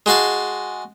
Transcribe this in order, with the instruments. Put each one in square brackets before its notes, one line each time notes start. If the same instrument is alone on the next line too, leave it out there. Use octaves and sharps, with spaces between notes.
[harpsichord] G#3 F#4 F5 A5